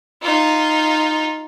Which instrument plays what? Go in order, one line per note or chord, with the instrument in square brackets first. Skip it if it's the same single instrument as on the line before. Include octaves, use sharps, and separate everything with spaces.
[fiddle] D#4 F4